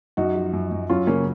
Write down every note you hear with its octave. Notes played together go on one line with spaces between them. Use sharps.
F#2 D#4 F#4
F3
F#2
F#2
F#3 C#4 F4
C#3 A#3 C#4